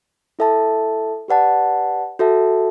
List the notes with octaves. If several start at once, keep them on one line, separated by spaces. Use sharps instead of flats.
E4 A4 E5 A5
G4 B4 D5 F#5 A5
F#4 A4 E5 A5